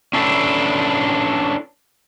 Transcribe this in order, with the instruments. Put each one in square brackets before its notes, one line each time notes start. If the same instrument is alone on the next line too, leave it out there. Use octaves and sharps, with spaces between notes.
[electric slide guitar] C#4 D4 E4 A4 B4